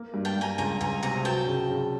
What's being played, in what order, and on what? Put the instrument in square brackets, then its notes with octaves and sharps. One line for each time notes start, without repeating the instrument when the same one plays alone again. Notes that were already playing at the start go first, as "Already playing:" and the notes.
Already playing: [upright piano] A#3
G2
[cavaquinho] G5 A5
[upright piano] G2
[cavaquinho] G#5 A#5
[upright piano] C#2 [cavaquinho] G#5 A#5
[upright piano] C#2 [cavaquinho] G#5 A#5
[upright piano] C3 [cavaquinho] G#5 A#5
[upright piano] F#3 [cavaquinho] G5 A5
[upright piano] C#3
C#3